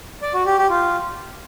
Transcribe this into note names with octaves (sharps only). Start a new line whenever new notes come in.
D5
F#4
G4
G4
F4